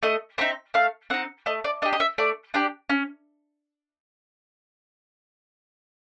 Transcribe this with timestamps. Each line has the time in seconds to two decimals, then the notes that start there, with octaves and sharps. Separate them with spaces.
0.03 A3 D#5
0.38 C4 D#4 E5
0.74 A3 F5
1.10 C4 D#4 F#5
1.46 A3 D#5
1.64 D5
1.82 D4 D#5
1.85 G4
1.93 D#5
2.00 E5
2.18 A3 D5
2.54 D4 G4 D5
2.90 C#4